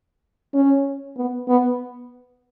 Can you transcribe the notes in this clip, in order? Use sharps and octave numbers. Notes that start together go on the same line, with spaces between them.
C#4
B3
B3